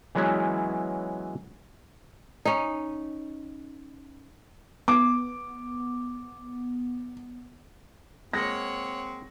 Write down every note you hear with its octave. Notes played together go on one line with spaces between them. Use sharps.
E3 F#3 G#3 B3 C#4 E4
C#4 D#4
B3 D6
G#3 A#3 C4 C#5 F#5 A#6